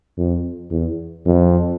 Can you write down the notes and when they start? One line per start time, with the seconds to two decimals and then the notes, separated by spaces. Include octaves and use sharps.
0.18 F2
0.71 E2
1.26 F2